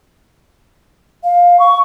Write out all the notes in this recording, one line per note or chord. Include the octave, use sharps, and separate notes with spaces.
F5
C#6